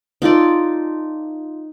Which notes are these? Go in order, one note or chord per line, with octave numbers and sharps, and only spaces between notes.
D#4 F4 A4 D5